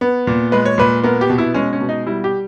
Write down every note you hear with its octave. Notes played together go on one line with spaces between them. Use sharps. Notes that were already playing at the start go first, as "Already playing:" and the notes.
B3
A#2
G#3 B4
C#5
A#2 B4
B3 A#4
G4
B2
E4
G#3 C#4
C#4
B2
D#4
G3 E4
G4